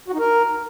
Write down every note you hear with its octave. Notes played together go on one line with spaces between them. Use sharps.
F#4
D#4
A#4